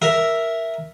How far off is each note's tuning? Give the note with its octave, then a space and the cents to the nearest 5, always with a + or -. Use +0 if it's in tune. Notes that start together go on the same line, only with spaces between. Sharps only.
A#4 +0 E5 +0